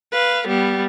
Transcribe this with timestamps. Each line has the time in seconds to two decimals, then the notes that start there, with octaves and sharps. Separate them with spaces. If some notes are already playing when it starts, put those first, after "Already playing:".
0.12 B4 F5
0.47 G3 B3